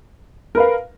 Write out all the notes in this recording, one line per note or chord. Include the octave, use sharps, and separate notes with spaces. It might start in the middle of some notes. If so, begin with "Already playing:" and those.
A#4 B4 F5